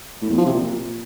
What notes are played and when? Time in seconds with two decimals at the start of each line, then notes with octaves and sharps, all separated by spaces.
0.22 A2
0.30 E2
0.38 F3
0.46 C3
0.54 A#2